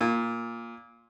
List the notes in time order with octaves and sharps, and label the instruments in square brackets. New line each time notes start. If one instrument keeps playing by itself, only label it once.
[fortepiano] A#2